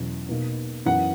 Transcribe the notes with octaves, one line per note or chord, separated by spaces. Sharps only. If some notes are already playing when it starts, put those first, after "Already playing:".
Already playing: E2 B2 F#3 C#4 E4
B2 A#3 D#4
F#2 E3 B3 F#5